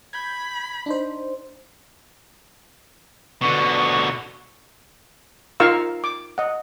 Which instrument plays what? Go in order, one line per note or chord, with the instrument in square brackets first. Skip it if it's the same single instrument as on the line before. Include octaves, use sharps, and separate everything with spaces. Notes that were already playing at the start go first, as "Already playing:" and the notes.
[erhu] B5 [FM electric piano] G6 G#6
[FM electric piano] D4 D#4 C5
[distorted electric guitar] B2 D3 [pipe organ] C#6
[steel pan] D#4 F4 A#4 F5 C#6 E6
D6
D#5 F#5